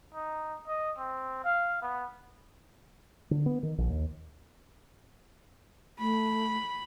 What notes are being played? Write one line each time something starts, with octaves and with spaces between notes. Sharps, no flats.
D#4
D#5
C4
F5
B3
D3
B3
D#3
A#1
D#2
A3 B5